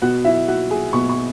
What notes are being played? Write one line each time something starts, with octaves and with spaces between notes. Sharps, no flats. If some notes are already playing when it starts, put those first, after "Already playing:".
B2 B3 F#4 F#5
E4 E5
F#4 F#5
G#4 G#5
B2 B3 C#6
C#6